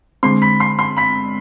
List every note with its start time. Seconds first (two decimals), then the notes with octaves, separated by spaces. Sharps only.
0.23 D3 G#3 C4 C6 C7
0.42 B5 B6
0.60 C6 C7
0.79 C6 C7
0.97 B5 B6